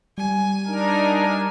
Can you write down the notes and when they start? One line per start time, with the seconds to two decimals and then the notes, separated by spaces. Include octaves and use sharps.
0.18 G3 G#5
0.67 D4 D#4 A#4